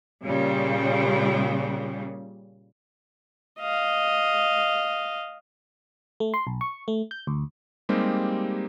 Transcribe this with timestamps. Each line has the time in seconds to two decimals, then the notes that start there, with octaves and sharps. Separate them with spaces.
0.24 A#2 C#3 G3
3.59 D#5 F5
6.20 A3
6.34 C6
6.47 B1
6.61 C#6
6.88 A3
7.11 G6
7.27 D2
7.89 G3 G#3 A#3 C4 D#4 G4